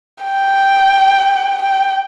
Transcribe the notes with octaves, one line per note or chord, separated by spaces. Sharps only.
G5
G5